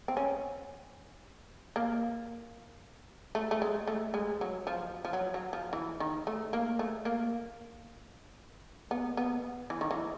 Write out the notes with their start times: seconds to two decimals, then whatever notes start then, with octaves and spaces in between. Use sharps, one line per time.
0.08 C4
0.17 C#4
1.76 A#3
3.35 A3
3.51 A3
3.62 G#3
3.88 A3
4.14 G#3
4.41 F#3
4.67 F3
5.05 F3
5.13 F#3
5.34 F#3
5.53 F3
5.73 E3
6.00 D#3
6.27 A3
6.53 A#3
6.79 A3
7.05 A#3
8.91 B3
9.17 B3
9.70 E3
9.81 D#3
9.91 E3